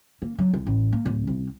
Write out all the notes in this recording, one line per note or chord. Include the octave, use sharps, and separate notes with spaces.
A#3
F#3
C2
A1
A#3
D1
C2